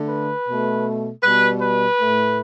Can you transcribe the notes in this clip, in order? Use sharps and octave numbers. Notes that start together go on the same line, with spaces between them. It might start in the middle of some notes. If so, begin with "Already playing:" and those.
Already playing: D3 A3
B4
B2 A3
B2 G3 B4
B4
A2 A3